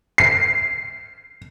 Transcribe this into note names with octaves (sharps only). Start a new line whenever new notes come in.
C7